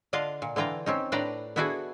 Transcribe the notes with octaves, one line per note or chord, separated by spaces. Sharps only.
D3 D4 F4 D#5 F5
A#2
D3 E3 F4 G5 A#5
C4 C#4 D#4
A2 D4 B4 C5 D5 A#5
B3 D4 E4 F#4 G#4 A4